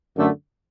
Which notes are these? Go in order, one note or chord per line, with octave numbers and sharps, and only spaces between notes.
F#2 D3 A3